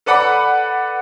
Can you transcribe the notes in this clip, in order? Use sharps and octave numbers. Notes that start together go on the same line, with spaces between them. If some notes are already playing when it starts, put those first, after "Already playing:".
A4 B4 D5 F#5 B5 D6